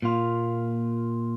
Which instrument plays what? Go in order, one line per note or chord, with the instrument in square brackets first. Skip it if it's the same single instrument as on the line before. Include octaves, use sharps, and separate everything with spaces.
[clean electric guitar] A#2 A#3 F4